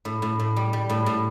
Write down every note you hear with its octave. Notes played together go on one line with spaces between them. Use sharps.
A2
A2
A2
G3
G3
A2
A2